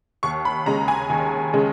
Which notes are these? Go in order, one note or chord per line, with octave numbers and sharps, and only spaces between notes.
D#2 C#6
B5
C#3 G#3 A#5
G#5
D#2
C#3 G#3